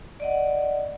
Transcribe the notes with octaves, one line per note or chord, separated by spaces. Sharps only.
D5 D#5 F#5